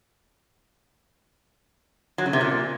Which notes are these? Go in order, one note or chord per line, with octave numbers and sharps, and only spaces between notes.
F#3
C#3
C3
A#2